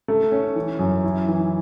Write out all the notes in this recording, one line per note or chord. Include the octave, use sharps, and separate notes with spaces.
A3
C#4
E3
F#2
E4
E3